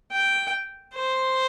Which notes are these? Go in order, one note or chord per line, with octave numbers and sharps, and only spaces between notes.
G5
C5